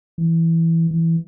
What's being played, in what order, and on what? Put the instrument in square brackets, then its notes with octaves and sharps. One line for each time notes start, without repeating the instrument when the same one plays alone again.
[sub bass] E3
E3